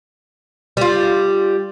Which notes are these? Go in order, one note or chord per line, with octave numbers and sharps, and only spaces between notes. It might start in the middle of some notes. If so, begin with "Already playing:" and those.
G3 F4